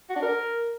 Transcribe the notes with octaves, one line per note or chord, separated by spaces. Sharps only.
F#4
D4
A#4